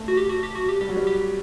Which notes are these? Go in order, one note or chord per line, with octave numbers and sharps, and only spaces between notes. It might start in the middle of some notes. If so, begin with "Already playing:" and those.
Already playing: A3
F#4
G4
F#4
G4
F#4
G4
G3 G4
F#3
G3
G4